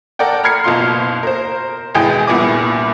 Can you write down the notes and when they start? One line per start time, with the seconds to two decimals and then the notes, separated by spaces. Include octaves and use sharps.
0.19 A4 A#4 D5 F#5 G5
0.43 A#5 B5 F6 G#6 C7 C#7
0.64 F#1 B2 F4 C6
1.23 A#4 C5
1.95 G#1 E2 B2 G#4 G5 G#5
2.27 C2 G2 A#2 B3 G#5 D6